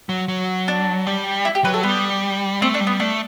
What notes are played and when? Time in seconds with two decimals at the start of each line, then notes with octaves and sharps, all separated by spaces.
0.09 F#3
0.28 F#3
0.68 D4
1.07 G3
1.45 E4
1.55 G4
1.64 F#3 B4
1.74 A4
1.83 G3 B3
2.62 A3 C4
2.74 D4
2.80 G3
2.87 B3
3.00 A3 D4